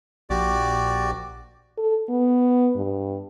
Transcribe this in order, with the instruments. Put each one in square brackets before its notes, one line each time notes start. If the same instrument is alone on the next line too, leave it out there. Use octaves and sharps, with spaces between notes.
[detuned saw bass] A#1 [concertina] F#4 G4 D5
[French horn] A4
B3
G2